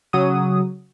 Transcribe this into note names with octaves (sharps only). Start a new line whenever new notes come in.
C#3 F#3 D#6